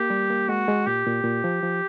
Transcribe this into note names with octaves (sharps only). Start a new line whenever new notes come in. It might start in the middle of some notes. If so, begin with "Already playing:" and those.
Already playing: A#3 G4
G3
A#3
G#3 F#4
G#3
A#2 G4
A#2
A#2
F3
F3